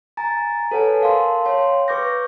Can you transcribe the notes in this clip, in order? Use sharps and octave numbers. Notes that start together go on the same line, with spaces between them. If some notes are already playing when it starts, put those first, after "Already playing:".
G#5 A#5 A6
A4 B4 C#5 F#5 G#5 A5
A#4 F5 A5 C6
C#5 F5 G5 C6
B4 C#6 D6 G6 A#6